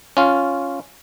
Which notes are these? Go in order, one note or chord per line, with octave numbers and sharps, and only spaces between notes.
C#4 F4